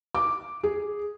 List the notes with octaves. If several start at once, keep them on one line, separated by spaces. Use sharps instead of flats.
D6
G#4